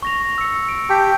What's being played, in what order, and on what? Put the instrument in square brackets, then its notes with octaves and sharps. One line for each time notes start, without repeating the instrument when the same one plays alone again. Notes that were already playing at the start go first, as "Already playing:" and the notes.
[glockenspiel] C#6 A#6 F7
E6 C#7
D7
[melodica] G4 [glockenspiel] A5 B6